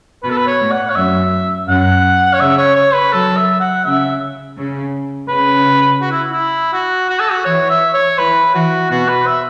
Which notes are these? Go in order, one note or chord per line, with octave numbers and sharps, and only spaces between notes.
B2 B4
A4
B4
C#5
A2
F#5
C#5
F#2 E5
F#2 F#5
C#5
C#3 E5
C#5
C#5
B4
F#3 A4
E5
F#5
C#3 E5
C#3
C#3 B4
F#4
E4
E4
F#4
F#4
A4
F#4
E3 C#5
E5
C#5
E3 B4
E3 F#4
B2 F#4
B4
E5